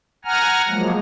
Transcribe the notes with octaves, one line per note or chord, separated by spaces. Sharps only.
F#5 G#5 A#5 F6
F3 F#3 G#3 A#3